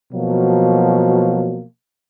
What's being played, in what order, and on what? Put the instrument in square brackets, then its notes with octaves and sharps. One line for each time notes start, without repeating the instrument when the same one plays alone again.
[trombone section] B2 F3 F#3 A#3